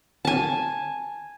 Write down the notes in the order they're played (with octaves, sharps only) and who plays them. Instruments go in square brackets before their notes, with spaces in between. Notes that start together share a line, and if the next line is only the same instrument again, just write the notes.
[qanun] G#5 A5